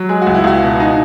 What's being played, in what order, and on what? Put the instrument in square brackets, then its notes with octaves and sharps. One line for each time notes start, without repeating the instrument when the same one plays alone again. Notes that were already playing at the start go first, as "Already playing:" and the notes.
Already playing: [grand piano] F#3
[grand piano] G#3 [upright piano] G#4
[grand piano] C#2 [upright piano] F#4
[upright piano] E4
[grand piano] C#2 [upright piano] F#4
[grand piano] B2
D#4